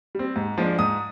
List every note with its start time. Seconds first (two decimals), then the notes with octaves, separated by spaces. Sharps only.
0.15 G3 C4
0.36 G#2
0.58 F3 G#3 D4
0.79 G#2 D#6